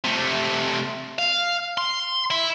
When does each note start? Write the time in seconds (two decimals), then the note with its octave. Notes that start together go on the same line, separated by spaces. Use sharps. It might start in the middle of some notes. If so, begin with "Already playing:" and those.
0.05 C3 A3
1.19 F5
1.78 C6
2.30 E4